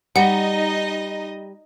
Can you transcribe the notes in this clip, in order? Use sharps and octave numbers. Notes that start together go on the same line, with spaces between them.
G3 D#4 D#5 F#5 C#7